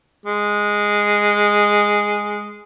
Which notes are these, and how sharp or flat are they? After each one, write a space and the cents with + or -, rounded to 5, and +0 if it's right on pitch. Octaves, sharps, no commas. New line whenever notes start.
G#3 -5